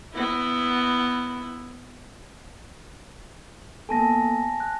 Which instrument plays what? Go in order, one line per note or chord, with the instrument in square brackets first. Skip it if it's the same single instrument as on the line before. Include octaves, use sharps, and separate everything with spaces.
[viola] B3 E4
[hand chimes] A#3 B3 A4 [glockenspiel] G#5 A5 A#6
[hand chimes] F#6